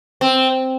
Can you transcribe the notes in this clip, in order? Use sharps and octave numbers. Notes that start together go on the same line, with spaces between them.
C4